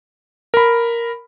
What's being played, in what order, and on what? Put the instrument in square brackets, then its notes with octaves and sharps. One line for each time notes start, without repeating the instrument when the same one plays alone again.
[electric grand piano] A#4 B5